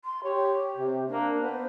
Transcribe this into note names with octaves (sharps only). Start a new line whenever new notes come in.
C6
G4 C#5
C3
A#3 D4
B3 C5